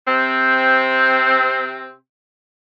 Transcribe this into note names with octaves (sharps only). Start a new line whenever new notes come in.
C3 C4